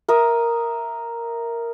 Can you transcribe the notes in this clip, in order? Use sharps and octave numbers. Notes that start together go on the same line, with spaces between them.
A#4 E5 D#6